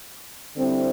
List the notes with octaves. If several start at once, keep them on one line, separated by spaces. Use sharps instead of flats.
D3 G3 C4 E4